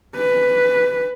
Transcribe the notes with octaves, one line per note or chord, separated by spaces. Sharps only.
B4